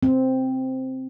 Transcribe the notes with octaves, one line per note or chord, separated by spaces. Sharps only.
C4